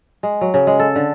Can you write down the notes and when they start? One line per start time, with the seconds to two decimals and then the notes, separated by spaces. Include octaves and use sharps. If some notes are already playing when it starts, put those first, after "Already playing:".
0.23 G#3
0.41 F#3
0.54 C#3
0.67 G#3
0.79 A4
0.96 D3